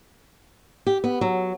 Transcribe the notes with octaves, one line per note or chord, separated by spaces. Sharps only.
G4
B3
F#3